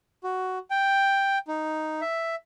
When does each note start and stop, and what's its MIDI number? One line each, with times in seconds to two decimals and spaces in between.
0.24 0.58 66
0.70 1.38 79
1.48 2.01 63
2.01 2.35 76